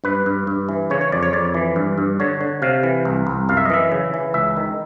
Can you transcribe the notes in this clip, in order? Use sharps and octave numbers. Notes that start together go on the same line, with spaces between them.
G2 B4
G2
G2
E3
C#3 C#5
C#5
F2 D5
C#5
F2 D5
E3
G2
G2
D3 C#5
D3
C3 F5
E3
C2
C2
F#2 F5
E5
D#5
E3 E5
C#3
E3
C#2 E5
D#3